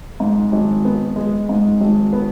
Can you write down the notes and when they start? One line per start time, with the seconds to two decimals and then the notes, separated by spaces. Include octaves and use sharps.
0.20 G#2
0.52 G#1
0.85 B3
1.16 G#3
1.49 G#2
1.81 G#1
2.13 B3